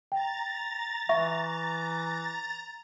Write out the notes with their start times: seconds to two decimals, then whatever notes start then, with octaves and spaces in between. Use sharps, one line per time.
0.12 G5 A#5 A6
1.09 E3 E5 C#6